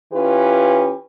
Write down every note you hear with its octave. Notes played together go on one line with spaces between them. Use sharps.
E3 C#4 F4 G4 B4